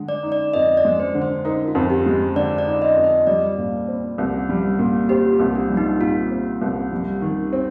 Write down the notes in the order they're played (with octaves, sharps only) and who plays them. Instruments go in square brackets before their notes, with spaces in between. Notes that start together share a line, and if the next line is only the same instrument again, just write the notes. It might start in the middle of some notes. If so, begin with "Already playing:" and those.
Already playing: [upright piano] D3 G#3
[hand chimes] D5
[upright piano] D#4
[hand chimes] D5
[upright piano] F2 [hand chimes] D#5
[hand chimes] D5
[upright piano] G#3
[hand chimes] C5
[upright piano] D3
[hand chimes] C5
[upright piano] D#4 [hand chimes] A#4
[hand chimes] F4
[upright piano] F2
[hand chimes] G4
[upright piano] G#3
[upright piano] D3 [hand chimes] D5
[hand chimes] D5
[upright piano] D#4
[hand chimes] D#5
[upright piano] F2
[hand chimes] D#5
[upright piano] G3 [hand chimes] D5
[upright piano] A#2
C4
C2
G3
A#2
[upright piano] C4 [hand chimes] G4
[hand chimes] F4
[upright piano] C2
[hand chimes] D4
[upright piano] G3
[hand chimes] D#4
[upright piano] A#2 [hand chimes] F4
[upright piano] C4
C2
G3
D#3
C4